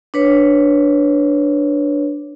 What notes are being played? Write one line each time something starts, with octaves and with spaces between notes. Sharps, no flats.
D4 B4 C#5